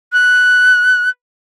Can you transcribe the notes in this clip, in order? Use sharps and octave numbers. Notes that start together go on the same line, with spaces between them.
F#6